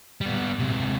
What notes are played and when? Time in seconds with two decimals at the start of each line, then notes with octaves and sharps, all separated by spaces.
0.21 G3 B3
0.59 C3 G#3